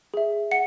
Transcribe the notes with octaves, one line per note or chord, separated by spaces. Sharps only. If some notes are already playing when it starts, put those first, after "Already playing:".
G#4 E5
F#5 C#7